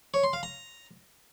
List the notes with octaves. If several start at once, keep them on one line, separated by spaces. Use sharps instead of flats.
C#5
C6
F5
A#5